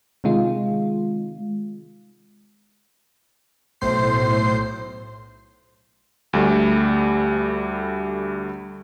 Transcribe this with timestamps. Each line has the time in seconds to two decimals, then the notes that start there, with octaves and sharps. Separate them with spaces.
0.24 C3 D#3 G#3 F4
3.81 B1 A2 C5 C7
6.33 D2 G3 A3